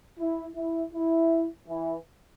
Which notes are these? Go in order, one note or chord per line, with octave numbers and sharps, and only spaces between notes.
E4
E4
E4
E3